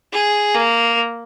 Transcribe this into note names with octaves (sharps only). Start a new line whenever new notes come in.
G#4
A#3